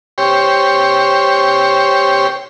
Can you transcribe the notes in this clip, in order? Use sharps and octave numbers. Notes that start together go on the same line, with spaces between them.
G4 C5 C#5